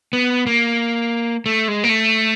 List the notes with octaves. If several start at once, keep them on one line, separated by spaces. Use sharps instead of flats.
B3
A#3
A3
G#3
A#3
A3